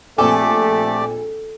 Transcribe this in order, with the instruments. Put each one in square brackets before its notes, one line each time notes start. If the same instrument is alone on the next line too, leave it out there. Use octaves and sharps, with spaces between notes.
[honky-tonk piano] A#1 C4 G#5 [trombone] A3 [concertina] G4 D5 D6 [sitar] A4